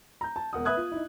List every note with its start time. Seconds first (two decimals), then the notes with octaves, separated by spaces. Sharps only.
0.21 A#5 G6
0.36 A5
0.53 E1 A#4 F#5 D#6
0.65 B4 E5 B5 D#6 F#6 G#6
0.77 F4
0.92 D#4 E4